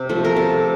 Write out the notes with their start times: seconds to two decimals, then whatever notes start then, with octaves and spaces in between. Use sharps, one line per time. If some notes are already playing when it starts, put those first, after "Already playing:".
Already playing: C3
0.09 F3 A3
0.24 A#4
0.36 C3 A4